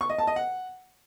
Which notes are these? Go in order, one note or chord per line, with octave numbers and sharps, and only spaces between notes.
C#6
D#5
A5
D#5
F#5